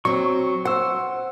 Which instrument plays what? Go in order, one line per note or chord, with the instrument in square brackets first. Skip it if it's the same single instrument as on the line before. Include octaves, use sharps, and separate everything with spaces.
[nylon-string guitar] F#3 C4 [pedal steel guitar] C#6
[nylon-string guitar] C5 [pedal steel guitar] F#5 E6